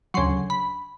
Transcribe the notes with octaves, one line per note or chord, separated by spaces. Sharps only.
D2 C#3 F#3 C6
B5